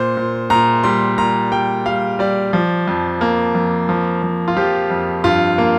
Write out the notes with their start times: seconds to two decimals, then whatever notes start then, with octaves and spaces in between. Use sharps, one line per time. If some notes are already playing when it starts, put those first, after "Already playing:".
Already playing: A#2 C5
0.17 A#2
0.50 A#2 A#5
0.84 G3 C6
1.18 A#2 A#5
1.52 G3 G5
1.86 G3 F5
2.19 G3 D5
2.53 F3
2.88 F2
3.21 A#3
3.55 F2
3.89 F3
4.23 F3
4.48 F4
4.56 F3 G4
4.90 F2
5.24 G2 F4
5.58 A#3